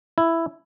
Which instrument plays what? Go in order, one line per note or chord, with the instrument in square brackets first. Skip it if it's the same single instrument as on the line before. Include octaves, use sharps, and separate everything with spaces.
[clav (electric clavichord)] E4